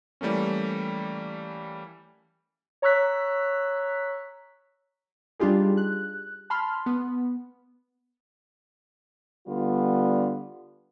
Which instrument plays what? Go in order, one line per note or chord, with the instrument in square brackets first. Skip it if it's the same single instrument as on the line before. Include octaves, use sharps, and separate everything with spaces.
[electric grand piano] E3 G3 A3 A#3 C#4
[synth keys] C#5 A#5 C#6 E6 F#6 B6
G3 D4 D#4 F4 G4 G#4
F#6
A5 B5 C6 F6
B3
[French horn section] D3 G3 B3 F4